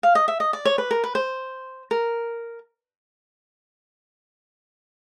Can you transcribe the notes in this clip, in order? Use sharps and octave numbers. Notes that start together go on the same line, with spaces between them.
F5
D#5
E5
D#5
D5
C#5
B4
A#4
B4
C5
A#4